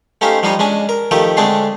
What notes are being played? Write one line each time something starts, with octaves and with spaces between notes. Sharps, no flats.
A3 C#4 D#4 G4 C5 F5
F3 G3 D#4 F4 C#5 D#5
G#3 C#4 D4 G#5
A#4
D#3 F3 A3 G4 A4 G5
D3 G#3 A3 C4 D4 G#4